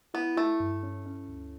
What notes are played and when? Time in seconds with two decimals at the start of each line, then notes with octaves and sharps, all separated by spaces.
0.14 B3 E4
0.37 A3 E4
0.60 G2
0.83 C#4
1.06 C#4
1.28 D2